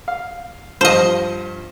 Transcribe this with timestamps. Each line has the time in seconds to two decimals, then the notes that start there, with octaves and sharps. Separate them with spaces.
0.08 F5
0.81 G2 F3 C5 D#5 F5